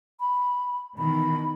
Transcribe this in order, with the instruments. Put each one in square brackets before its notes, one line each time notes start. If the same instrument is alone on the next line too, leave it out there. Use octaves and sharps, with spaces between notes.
[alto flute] B5
[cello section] B2 D#3 E3 [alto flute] B5